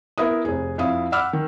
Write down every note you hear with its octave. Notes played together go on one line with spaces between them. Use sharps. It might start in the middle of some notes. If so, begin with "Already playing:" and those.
B3 E4 A#4 D#6
F1 G#4
F2 E4 F5 D#6
F#5 B5 D6 E6 F6
D#3